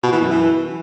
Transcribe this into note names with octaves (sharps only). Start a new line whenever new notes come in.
B2
E3
F#2
E3